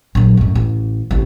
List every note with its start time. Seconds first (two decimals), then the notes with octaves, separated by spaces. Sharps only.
0.15 A#1 F#3
0.37 F#2 A2
0.55 A1
1.11 A1 C3